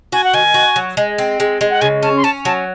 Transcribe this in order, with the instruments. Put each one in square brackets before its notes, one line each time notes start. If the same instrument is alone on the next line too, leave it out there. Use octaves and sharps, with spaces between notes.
[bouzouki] F#4 [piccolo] G#5
[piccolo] F#5
[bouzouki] D#3 [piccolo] G#5
[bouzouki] F#4
F#3
G#3
C4
G#3
G#3
[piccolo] F#5
[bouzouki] C#3 [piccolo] G#5
[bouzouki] C#4 [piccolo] A5
[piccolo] C6
[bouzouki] C#4 [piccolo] A5
[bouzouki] F#3 [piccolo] A5